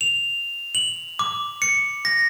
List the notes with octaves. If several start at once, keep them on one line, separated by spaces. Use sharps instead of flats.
F7
F#7
D6
C#7
A#6